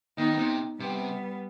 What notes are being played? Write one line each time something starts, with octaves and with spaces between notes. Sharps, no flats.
D#3 B3 D#4
C3
C3 G3 B3